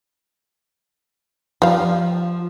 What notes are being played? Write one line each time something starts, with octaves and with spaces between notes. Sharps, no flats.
F3 G3 F5